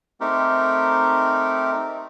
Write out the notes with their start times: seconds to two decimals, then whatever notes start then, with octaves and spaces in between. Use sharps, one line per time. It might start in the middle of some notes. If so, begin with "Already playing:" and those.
0.21 A3 C4 D#4 G4 A#4